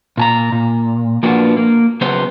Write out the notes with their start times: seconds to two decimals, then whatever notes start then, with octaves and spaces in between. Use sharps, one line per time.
0.17 A#2 A5 A#5
0.52 A#2
1.23 F3 A#3 B3 D4 F#4
1.57 A#3
2.01 C#3 F#3 B3 C5